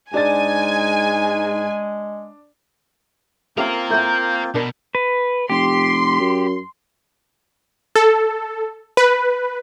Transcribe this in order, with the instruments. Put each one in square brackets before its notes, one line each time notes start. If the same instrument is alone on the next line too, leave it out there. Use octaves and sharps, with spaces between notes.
[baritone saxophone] G#2 [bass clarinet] G#3 [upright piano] D4 A6 [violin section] G#5
[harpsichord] A3 C#4 G4 [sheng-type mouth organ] A#3 C4 F4 [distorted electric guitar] A#4 F5
[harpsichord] A2 A3 F#5 [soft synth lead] G6
[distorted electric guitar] B2 [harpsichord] D4 A#4 C6 [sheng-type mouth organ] A#5
[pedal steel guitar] B4
[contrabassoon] F1 [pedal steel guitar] G4 [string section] C6
[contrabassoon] F#2
[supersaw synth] A4
B4